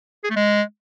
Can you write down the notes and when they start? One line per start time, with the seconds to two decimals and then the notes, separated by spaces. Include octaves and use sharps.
0.24 G#4
0.30 A3
0.36 G#3